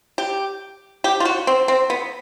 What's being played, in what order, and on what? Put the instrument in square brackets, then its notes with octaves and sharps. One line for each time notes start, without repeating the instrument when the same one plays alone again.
[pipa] G4
G4
F4
F#4
C4
C4
B3